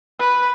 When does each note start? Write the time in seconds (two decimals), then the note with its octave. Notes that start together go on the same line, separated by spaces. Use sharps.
0.19 B4